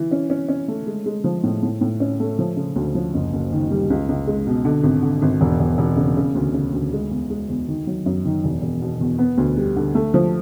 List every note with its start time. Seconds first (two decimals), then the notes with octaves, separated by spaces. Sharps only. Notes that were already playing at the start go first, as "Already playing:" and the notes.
Already playing: E3
0.11 C#4
0.30 C#4
0.49 C#4
0.68 A3
0.87 G#3
1.06 G#3
1.24 F3
1.43 A2
1.63 A2
1.81 A2
2.00 C#4
2.20 A3
2.39 F3
2.57 C#3
2.76 D2
2.95 F3
3.14 F#1
3.33 F#1
3.52 D#3
3.71 G3
3.90 C#2
4.08 C#2
4.27 G#3
4.47 B2
4.65 D3
4.83 G#1
5.03 D3
5.22 G#1
5.41 E1
5.59 E1
5.78 E1
5.97 C#3
6.17 C#3
6.35 D2
6.54 C#3
6.73 D2
6.93 G#3
7.11 E2
7.30 G#3
7.49 E2
7.68 D#3
7.87 F#3
8.06 F#2
8.25 D#3
8.44 E1
8.62 E1
8.81 B2
9.01 E2
9.19 B3
9.38 D2
9.57 G3
9.76 D3
9.95 A3
10.14 F3